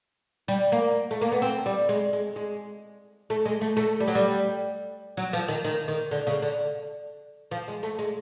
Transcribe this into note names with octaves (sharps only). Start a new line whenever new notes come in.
G3
A#3
A3
A#3
B3
C4
G3
G#3
G#3
G#3
A3
G#3
A3
A3
G3
F#3
G3
F#3
F3
D#3
D#3
D#3
D3
C#3
D3
F3
G#3
A3
G#3